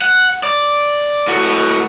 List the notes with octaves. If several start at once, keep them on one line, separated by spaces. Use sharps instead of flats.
F#5
D5
A2 F#4